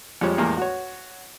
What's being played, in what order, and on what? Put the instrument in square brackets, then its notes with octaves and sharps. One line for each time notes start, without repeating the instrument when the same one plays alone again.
[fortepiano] F2 F3 G3 G#3 C#5
E2 A2 G3 G#3 A#3
F#4 C#5